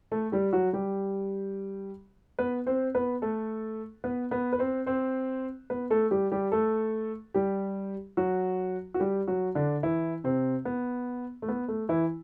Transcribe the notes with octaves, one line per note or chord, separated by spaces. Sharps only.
A3 A4
G3 G4
F#3 F#4
G3 G4
B3 B4
C4 C5
B3 B4
A3 A4
B3 B4
B3 B4
B4
C4 C5
C4 C5
B3 B4
A3 A4
G3 G4
G3 G4
A3 A4
G3 G4
F#3 F#4
F#4
G3 G4
F#3 F#4
D3 D4
E3 E4
C3 C4
B3
A3
B3
A3
E3 E4